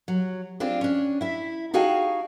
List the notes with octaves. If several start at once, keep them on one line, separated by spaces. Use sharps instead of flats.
F#3
C4 D4 F4 G#4 D5
C#4 D4
E4 E5
D#4 F#4 G#4 F5 G5 A5